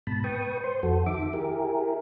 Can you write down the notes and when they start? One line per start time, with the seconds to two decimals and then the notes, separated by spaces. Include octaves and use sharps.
0.07 G#2 B2 A5 B5
0.24 B4 G5 C#6 D#6
0.64 C5 C6
0.83 F2 F#4 A4
1.06 D#3 E5 D6
1.33 E4 G4 G#4 A#4